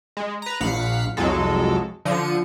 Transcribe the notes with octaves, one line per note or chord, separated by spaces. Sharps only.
G#3
B4 A#5
A#1 F5 F#5 B6 C#7
C2 F2 F#3 G#3 A4
D3 F3 C#7 D#7